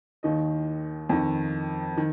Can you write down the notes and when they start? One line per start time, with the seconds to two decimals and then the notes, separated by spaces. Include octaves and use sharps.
0.23 D#2 D#3 D#5
1.10 F2 D#3
1.97 D#3